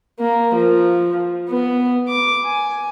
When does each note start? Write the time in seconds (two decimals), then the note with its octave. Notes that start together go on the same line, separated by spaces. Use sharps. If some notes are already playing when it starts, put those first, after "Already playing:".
0.20 A#3
0.55 F3
1.49 B3
2.09 D6
2.44 G#5